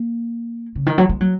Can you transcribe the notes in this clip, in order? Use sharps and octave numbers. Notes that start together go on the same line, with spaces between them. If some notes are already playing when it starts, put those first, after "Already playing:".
Already playing: A#3
C#3
D#3
F#3
G#3
F#3